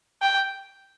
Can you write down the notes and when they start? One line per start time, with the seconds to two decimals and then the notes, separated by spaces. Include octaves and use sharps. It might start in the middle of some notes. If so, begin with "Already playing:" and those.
0.22 G5